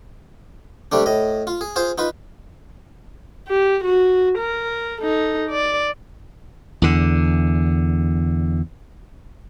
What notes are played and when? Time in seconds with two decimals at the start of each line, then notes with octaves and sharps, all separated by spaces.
0.92 C3 G3 A3 D4
1.06 A2 D#5
1.47 F4
1.61 G#4
1.76 F4 G#4 C5
1.98 D#4 F4 B4
3.48 G4
3.84 F#4
4.38 A#4
5.01 D#4 A4
5.50 D5
6.82 E2 D3